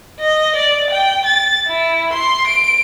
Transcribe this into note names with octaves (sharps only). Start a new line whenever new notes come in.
D#5
D5
G5
A6
E4
C6
D7